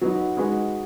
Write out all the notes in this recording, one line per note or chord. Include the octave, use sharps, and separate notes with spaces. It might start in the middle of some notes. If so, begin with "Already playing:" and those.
F#3 B3 D#4
G#3 D#4 F#4 B4